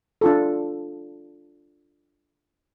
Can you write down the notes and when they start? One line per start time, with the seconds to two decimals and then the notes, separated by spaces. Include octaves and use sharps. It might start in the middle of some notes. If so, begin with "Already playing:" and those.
0.21 D4 F4 A4